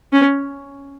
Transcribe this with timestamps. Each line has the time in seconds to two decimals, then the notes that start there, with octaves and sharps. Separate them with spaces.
0.13 C#4